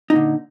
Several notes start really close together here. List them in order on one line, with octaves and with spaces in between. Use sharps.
D#4 A#2 D3